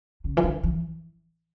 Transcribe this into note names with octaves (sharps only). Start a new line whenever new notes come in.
C#3
E3
D3
E3